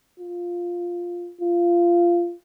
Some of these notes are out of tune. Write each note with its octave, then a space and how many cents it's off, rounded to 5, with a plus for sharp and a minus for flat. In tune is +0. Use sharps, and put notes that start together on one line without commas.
F4 +5
F4 -15